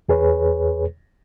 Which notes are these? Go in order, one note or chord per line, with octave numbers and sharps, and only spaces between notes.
E2 G#4 B4 C#5